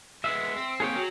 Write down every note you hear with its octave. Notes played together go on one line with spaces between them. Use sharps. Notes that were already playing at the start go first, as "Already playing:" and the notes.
G#3 B3 E5
C4
C3 A#3 G#4 C#5 G5
F#3